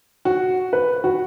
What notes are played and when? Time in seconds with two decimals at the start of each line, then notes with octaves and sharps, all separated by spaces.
0.25 F#4
0.73 B4
1.04 F#4